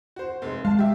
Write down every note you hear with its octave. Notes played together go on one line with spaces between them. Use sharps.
F#4 C5
F1 G#3
G#3 F5 A5
G4 E5